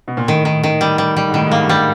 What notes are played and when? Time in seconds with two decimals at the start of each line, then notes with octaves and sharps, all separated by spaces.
0.08 B2
0.17 A#2
0.27 A2 D#3
0.45 D#3
0.63 D#3
0.81 G3
0.98 G3
1.16 G3
1.28 G#2
1.34 A2 D#3
1.47 G#2 A#3
1.61 G2
1.69 G3